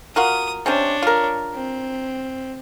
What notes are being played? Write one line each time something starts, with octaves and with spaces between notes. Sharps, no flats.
F4 F#4 A#4 D#6
C3 C#4 D4 C5 C#5
F4 A#4
C4